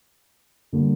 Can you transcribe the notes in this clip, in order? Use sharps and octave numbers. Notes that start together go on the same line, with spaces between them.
D3 G3 A#3